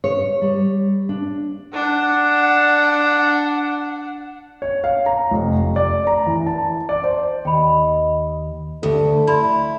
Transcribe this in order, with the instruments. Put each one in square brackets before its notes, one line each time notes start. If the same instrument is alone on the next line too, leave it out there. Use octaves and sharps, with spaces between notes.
[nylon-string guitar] C#5
G3
D4
[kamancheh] D4 F#5
[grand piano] C#5
F5
A#5
F1
F1
D5
A#5
E3
A5
D5
C5
[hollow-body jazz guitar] D#2 [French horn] D#5 [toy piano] G5 B5
[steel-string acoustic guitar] D2 [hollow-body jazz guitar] G4 [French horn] A4
[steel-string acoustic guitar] E4 [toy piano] D5 B5 C6